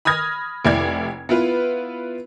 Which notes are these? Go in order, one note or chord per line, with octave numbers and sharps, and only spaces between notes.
B5 D#6 F6 G#6 A#6
F1 E4 D5 G#6
B3 E4 F4 B4